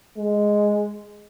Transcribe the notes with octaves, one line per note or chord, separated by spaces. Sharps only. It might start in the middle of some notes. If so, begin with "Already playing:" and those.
G#3